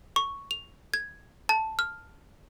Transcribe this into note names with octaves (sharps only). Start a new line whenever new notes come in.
C#6
F7
G#6
A5
F6